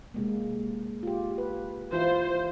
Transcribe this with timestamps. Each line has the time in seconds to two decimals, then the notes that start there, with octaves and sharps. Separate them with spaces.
0.14 C3 G#3 A#3
1.03 F4 G4
1.38 B4
1.92 E3 E4 F4 C5